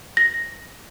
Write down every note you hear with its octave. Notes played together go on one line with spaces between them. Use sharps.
A#6